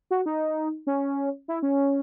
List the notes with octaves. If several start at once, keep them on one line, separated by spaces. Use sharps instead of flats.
F#4
D#4
C#4
E4
C#4